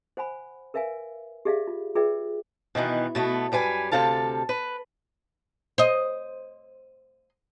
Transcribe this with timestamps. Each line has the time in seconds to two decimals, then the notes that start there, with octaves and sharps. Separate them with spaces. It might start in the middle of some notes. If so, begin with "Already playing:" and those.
0.17 C5 F#5 G#5 B5
0.74 A#4 B4 E5 F5 G#5
1.45 G4 G#4 D5 E5 F5
1.67 F4
1.95 F4 G#4 B4 D5 E5 G5
2.75 B2 D#3 E3 B3
3.15 B2 A3 B3
3.52 F#2 G3 B4 G#5
3.92 D2 G#2 C3 A4 F5 A5
4.49 B4
5.78 C5 D#5